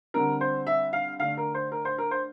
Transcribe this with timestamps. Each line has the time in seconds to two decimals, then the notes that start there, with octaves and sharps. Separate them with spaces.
0.14 D3 G3 C4 A#4
0.41 C5
0.67 E5
0.93 F5
1.19 D3 A3 D4 F5
1.37 A#4
1.54 C5
1.72 A#4
1.85 C5
1.98 A#4
2.11 C5